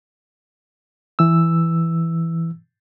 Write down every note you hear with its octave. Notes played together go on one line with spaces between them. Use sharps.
E3 E6